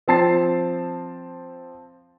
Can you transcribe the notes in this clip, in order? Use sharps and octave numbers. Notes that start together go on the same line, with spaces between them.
F3 C4 A5 A6 C7